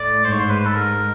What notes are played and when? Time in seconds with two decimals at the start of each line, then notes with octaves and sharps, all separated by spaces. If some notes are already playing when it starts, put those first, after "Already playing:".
Already playing: A2 D5
0.25 G#2 C5
0.32 C#5
0.40 C5
0.50 B4
0.65 A4
0.75 A#4